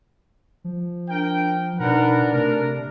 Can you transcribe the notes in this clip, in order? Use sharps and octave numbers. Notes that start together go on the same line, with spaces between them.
F3
D4 A#4 G5
B2 D4 D#4 A#4 B4 F#5
C3 A3 A#4